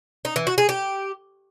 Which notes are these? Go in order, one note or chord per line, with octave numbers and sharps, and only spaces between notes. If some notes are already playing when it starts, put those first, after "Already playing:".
D#4
E3
F#4
G#4
G4